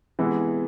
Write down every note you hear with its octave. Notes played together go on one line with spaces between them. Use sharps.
C3 E3 G#3 B3 E4